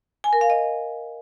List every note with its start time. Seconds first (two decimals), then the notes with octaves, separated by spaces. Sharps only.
0.24 G#5
0.33 A#4
0.41 F5
0.50 D#5